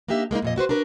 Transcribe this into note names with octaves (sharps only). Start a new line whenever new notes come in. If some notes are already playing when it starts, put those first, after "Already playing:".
A#3 D4 D#4 G4 E5
G#3 A#3 C4 D#4
F2 A#2 D#5
E4 F#4 B4 C5
D4 F#4 A#4 B4